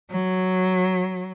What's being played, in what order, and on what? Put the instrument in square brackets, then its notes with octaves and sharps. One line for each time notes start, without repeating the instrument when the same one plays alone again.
[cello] F#3